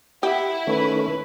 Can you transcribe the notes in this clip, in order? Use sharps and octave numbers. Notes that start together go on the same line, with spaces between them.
E4 G4 F#5
D#3 A3 C#4 B4 B5